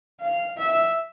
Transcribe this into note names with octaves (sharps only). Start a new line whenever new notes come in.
F5
E5